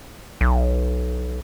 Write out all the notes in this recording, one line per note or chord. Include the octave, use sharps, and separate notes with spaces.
B1